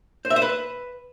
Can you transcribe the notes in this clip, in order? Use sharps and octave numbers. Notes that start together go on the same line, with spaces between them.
C5
E5
C5
B4